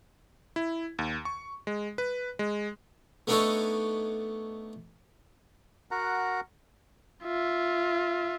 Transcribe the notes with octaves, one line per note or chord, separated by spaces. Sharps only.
E4
D#2
C#6
G#3
B4
G#3
A3 B3 D4 D#4 A4 C#5
F#4 A#4 F#5 A#5
F4 E5